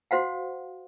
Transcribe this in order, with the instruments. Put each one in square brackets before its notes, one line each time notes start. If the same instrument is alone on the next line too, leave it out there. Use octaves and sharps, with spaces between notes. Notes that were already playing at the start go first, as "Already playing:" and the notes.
[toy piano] F#4 C5 F5 F#5